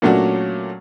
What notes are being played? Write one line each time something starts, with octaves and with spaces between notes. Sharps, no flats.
A#2 F#3 A3 C#4 D4 F#4